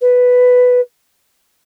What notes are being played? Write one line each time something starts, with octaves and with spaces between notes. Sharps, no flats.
B4